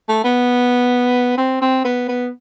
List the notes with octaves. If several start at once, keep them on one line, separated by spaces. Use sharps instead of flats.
A3
B3
C4
C4
B3
B3